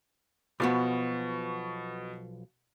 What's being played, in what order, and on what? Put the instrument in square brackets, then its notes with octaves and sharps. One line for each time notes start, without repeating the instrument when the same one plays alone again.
[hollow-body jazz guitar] B1 F3 B3 [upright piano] B2 C#6